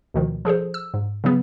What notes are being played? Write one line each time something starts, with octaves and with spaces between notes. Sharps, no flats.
D2 B2 D#3 F3
F3 G#4 A4 C5
E6
G#2
C#3 F#3 B3